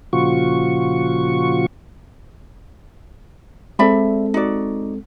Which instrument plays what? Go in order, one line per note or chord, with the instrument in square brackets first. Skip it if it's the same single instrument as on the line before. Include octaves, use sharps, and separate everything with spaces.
[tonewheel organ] A#2 C#3 F3 F4 F#4 C#6
[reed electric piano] G#3 C4 A4 [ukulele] D5 E5 B5
[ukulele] D#4 F#4 D5